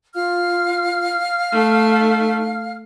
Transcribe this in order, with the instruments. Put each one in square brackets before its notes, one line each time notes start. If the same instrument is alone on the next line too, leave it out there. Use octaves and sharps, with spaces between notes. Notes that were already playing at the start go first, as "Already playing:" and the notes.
[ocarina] F4 [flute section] F5 F6
[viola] A3 [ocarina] D#4